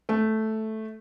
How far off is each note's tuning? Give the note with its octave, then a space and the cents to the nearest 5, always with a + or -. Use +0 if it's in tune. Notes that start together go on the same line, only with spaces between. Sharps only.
A3 -5